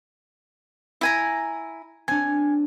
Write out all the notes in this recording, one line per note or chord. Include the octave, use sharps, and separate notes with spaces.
E4 G#5 A#5
C4 D4 G#5